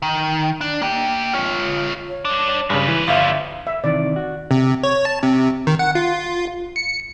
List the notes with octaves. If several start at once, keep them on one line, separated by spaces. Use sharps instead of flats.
D#3
D4
A#3 G5
F4 C#5
C#5
G2 D4
G2 C#3 G#3 B4
E3
G1 F3 G3 E5 F5
E5
C3 D#3 E3 D5
F#4
C3
C#5
A5
C3
D#3
F#5
F4
C#7